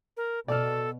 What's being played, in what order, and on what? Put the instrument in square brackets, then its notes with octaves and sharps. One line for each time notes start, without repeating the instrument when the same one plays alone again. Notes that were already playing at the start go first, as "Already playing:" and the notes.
[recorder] A#4
[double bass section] B2 [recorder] A4 [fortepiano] D5 F6